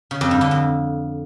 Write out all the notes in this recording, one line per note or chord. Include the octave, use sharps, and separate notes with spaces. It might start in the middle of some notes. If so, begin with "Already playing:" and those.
C#3
F2
G2
D3
F2